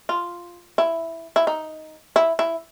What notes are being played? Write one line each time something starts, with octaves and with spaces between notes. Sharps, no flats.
F4
E4
E4
D#4
E4
E4